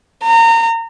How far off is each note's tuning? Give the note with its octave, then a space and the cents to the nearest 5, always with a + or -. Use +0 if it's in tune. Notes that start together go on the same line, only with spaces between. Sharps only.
A#5 -30